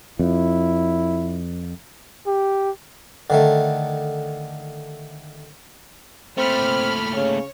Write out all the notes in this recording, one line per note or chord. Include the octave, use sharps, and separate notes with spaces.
F2 E4
G4
D3 D#3 A3
A#2 A3 C4 B5 F6
C#3 C#5